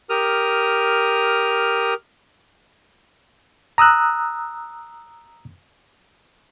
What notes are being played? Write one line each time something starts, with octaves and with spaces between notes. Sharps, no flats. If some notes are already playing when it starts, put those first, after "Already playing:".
G4 A#4 D#6 F6
A#5 D#6 E6 F#6